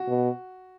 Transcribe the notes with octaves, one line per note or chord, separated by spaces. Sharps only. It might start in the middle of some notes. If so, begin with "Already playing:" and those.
Already playing: F#4
B2